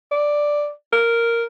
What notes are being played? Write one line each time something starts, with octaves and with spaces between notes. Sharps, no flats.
D5
A#4